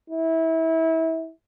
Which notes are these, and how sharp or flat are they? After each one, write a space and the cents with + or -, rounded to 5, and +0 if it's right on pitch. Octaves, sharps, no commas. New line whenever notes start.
E4 -25